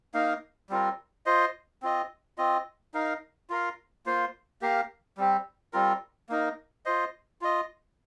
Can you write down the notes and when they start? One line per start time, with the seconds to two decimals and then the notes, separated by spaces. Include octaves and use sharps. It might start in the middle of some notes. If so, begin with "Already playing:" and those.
0.14 A#3 D#4 A#4 F5
0.70 G3 C4 F4 A#4
1.26 F4 C5 D#5
1.82 C4 F4 D#5
2.38 C4 F4 D#5
2.94 D#4 A#4 F5
3.50 F4 A#4 F5
4.06 A#3 F4 C5
4.62 A#3 G4 A#4 F5
5.17 G3 C4 G4
5.73 G3 C4 F4 A#4
6.29 A#3 D#4 A#4
6.85 F4 C5 D#5
7.41 F4 D#5